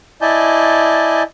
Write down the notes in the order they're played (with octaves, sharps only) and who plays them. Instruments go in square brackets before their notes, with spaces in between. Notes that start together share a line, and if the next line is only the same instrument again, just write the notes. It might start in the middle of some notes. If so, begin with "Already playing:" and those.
[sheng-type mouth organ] E4 D5 D#5 G#5 A5 G6